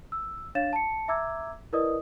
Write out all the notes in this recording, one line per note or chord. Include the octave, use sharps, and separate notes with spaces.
E6
D4 C#5 F5 A6 E7
A5 C#7
E5 A#5 D6 E6 G#6
E4 A#4 B4 D5 D#5 D#6